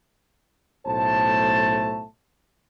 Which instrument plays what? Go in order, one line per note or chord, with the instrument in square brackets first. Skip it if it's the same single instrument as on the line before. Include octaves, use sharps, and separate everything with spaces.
[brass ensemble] B1 A2 A3 C5 A5